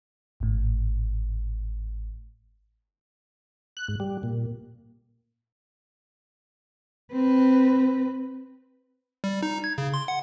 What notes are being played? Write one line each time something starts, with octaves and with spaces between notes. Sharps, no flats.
G#1 A2
F#6
G#2
G3
A#2
C4 B4
G3
D#4
G#6
C#3
C6
F#5